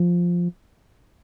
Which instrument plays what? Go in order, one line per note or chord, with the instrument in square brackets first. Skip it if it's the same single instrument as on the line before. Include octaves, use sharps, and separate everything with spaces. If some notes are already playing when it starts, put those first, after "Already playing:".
Already playing: [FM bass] F3